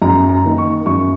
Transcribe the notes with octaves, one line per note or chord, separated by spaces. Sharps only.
F#2 A#5
A#5
D#3 A#3 D#4
C#6
F#2 C#6